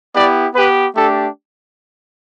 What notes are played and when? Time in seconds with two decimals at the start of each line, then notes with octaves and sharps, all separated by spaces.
0.14 B3 E4 G4 D5
0.55 B3 G4 B4
0.95 A3 D4 G4 A4